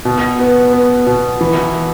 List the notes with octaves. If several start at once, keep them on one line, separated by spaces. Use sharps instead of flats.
B2
B3
B3
B2
E3